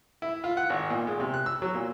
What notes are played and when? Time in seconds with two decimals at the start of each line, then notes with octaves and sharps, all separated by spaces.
0.22 E4
0.44 F4
0.57 F#5
0.70 G#1
0.90 A#2
1.07 G#3
1.20 C3
1.34 F#6
1.46 E6
1.62 F#3
1.75 A#2